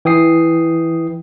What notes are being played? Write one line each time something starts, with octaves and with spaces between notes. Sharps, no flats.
E3 G5 D#6 C7